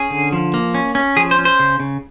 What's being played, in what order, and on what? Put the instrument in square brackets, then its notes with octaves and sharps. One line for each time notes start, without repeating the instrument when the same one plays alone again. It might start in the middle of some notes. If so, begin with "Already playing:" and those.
Already playing: [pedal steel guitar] C#4 G#4
D3
F3
A#3
C#4
C#4
F3 G#4
C5
C#4
C5
C#3
C#3